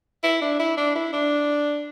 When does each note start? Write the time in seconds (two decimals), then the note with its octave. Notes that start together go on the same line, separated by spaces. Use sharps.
0.23 E4
0.42 D4
0.59 E4
0.77 D4
0.95 E4
1.13 D4